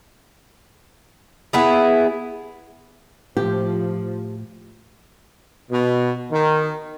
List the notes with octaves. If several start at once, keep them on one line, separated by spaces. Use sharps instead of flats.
B3 E4 G#4
A2 F3 G4
B2
D#3